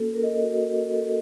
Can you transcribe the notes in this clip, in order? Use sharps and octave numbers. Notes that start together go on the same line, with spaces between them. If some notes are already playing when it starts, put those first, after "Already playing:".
Already playing: A#3 C#4 F#4 A4
A#4
D#5
A4
F#4
F#4
A4